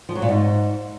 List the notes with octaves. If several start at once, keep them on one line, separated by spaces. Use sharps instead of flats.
F3
F#3
A#2
G#2